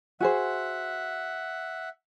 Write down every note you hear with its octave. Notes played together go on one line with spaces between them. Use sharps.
F#4 G#4 C5 E5 F#5